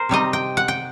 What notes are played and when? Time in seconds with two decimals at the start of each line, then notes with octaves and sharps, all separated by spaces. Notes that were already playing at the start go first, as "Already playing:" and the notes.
Already playing: A#4 C5
0.09 C3 G3 C4 D#4 D#5
0.33 G5
0.57 F#5
0.68 G5